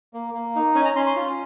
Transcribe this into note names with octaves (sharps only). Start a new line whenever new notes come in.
A#3
A#3
D#4
C#4 G#5
A#5
C#4 C6
C6
F4